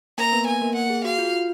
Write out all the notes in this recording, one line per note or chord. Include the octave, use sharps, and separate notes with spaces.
A#3 A#4 A#5
B3 B4
G#5
A#3 A#4
F#5
G#4
F#4 F5
F4
F4